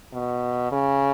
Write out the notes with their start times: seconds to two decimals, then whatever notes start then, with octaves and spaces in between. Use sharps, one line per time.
0.13 B2
0.72 C#3